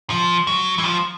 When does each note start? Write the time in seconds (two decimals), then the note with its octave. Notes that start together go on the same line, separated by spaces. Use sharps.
0.10 F3
0.47 F#3
0.78 E3
0.84 F3